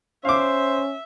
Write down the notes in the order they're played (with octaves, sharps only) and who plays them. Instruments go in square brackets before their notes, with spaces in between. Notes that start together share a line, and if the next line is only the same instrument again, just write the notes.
[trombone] C#4 [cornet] C5 [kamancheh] E5 [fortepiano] F5 D6